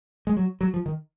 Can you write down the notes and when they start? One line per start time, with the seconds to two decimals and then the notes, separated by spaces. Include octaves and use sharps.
0.27 G#3
0.37 F#3
0.61 F#3
0.74 F3
0.86 D#3